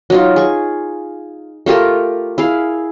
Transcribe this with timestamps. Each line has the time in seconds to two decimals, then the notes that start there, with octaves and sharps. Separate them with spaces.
0.10 F#3 D#4 F4
0.36 G#4 C#6
1.66 A3 F4 G4 A#4
2.38 E4 G#4 F5